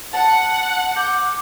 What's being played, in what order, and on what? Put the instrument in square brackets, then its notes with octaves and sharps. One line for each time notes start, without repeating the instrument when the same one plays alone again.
[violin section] F#5 [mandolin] A5
[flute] D6 [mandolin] G6